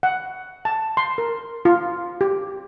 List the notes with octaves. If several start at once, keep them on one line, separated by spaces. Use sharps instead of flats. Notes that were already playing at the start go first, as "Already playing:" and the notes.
F#5
A5
C6
A#4
F4
G4